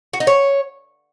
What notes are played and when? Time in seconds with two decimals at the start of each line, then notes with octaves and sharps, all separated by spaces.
0.13 F#4
0.20 D#4
0.27 C#5